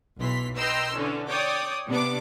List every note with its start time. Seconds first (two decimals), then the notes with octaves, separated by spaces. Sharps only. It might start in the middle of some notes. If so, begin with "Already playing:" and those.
0.18 B1 E3 C6 B6
0.56 B4 D#5 G5 A#5 C6 E6
0.94 D3 E3 C#4 D4
1.27 C#5 D5 G5 D6 D#6
1.88 C3 B3 D4 D6